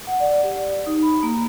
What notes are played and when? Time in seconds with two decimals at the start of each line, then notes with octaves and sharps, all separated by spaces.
0.07 F#5
0.20 D5
0.43 G4
0.87 D#4
1.03 B5
1.23 A#3